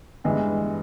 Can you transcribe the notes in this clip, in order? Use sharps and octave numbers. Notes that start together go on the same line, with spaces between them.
G2 E3 G#3